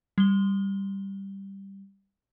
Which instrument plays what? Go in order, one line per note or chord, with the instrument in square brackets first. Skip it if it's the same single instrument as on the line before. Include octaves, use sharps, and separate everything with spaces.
[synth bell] G3 G7